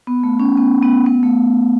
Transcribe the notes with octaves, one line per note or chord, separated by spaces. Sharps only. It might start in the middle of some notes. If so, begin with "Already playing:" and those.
B3
A3
C#4
B3
B3
B3
A3